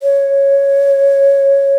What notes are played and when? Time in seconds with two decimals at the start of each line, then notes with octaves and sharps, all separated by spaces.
0.03 C#5